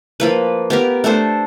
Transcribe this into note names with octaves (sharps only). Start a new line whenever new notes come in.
F3 A#3 B4
B3 G4 A#4
A3 D4 A4 C5